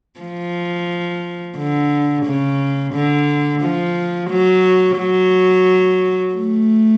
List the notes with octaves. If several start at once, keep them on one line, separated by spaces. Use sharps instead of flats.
F3
D3
C#3
D3
F3
F#3
F#3
A3